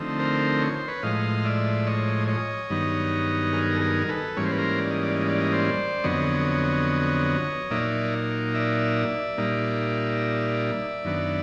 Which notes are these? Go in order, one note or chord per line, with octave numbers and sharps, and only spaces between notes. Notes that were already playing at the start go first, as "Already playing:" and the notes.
Already playing: D3 F3 A3 C4 D#4
A#4 C5
C#5
C5
B4 C#5
A2 F3 G#3 D#5 F5
D5 E5
C#5 D#5
C#5 D#5
G2 D#3 F#3 B3 D#4
G#4 A#4
A4
G#4 A#4
A4 B4
G#2 E3 G3 A#3 C#4 C#5
C5
B4
A#4 C5
D5
D#5
D5
D#5
D5
D#5
C5 D5
F2 D3 F#3 B3 C#5 D#5
A#2 F#3 A#3 D#4 D5 E5
D5 E5
A#2 G3 A#3 D#4
F#2 D#3 F#3 B3 D4